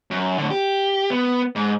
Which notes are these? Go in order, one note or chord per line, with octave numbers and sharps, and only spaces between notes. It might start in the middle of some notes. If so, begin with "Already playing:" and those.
F#2
A2 D3
G4
B3
G#2